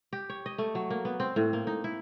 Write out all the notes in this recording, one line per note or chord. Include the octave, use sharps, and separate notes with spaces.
G4
C#5
D#5
A3
F#3
A#3
B3
C4
A2
A#3
D#4
E4